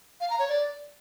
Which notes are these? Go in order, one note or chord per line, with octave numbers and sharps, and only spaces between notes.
F5
A#5
C#5
D5